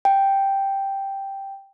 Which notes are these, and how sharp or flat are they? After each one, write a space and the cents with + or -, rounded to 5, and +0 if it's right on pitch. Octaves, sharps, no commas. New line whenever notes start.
G5 +0